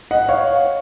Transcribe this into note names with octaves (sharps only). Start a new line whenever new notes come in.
D#5 F#5
C#5 F5